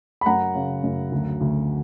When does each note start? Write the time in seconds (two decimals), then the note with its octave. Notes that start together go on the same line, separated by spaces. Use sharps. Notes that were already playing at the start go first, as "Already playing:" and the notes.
0.21 B5
0.26 F#2 F#5 A#5
0.55 C#3
0.84 F#2
1.12 D2
1.41 D2